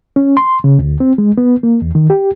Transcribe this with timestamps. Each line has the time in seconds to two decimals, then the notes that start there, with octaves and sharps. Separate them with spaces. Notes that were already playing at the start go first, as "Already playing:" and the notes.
0.16 C#4
0.37 C6
0.64 C#3
0.79 D2
1.00 C4
1.18 G#3
1.38 B3
1.63 A#3
1.82 E2
1.95 D#3
2.10 G4